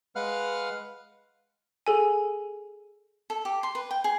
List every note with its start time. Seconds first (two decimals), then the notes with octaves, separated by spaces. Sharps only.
0.16 G#3 B4 F5 F#5 F6
1.87 G#4 A4 G#5
3.30 A4
3.45 G4
3.63 C6
3.75 B4
3.91 G5
4.04 G#4